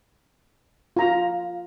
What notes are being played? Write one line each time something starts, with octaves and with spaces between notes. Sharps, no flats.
F4 A#5